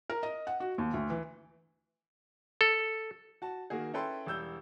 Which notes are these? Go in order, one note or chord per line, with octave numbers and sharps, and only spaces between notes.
A#4
D#5
F#5
F#4
D#2
D2
E3
A4
F#4 A5
D#3 A#3 F#4 G#4
C#4 E4 A4 B4 G5 C6
E1 G3 E6 G6 G7